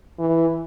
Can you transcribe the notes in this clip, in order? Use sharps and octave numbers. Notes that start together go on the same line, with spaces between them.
E3